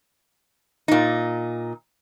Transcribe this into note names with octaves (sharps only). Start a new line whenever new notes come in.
A#2 D#4